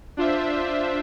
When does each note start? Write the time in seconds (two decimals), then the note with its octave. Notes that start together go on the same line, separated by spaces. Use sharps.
0.17 D4 F4 C5 E5